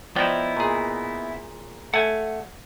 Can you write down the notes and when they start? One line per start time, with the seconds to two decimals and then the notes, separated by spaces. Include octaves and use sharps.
0.16 F3 B3 D#4 E4 D5 G5
0.56 A#2 G#4
1.94 A3 F#5 G#5